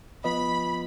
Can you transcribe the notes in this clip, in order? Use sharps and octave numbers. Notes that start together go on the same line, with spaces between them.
F3 B3 F4 B4 D#5 B5